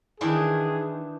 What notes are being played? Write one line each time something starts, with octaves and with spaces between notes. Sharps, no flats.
D#3 E3 D4 G#4